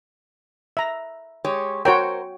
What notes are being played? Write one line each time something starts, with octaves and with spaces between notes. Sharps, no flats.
E5 A#5
G#3 G4 C#5
F#4 A#4 C5 C#5 G5